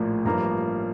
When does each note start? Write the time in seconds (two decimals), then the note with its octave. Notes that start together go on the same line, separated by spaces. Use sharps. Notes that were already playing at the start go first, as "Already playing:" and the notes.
Already playing: A#1 A2 F3 A#3
0.25 A1 G2 F3 A#3 A#5